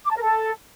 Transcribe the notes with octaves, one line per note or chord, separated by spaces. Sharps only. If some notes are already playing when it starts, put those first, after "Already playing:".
D6
A5
A#4
A4